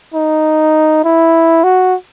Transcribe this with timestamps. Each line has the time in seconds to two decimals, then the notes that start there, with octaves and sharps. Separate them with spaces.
0.14 D#4
1.04 E4
1.64 F#4